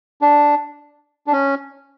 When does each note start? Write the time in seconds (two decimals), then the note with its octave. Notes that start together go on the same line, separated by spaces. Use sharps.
0.21 D4
1.27 D4
1.33 C#4